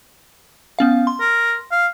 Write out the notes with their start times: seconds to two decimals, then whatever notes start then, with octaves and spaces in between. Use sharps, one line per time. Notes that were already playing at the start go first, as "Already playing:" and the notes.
0.79 B3 C#4 F5
1.07 C6
1.20 A#4
1.71 F5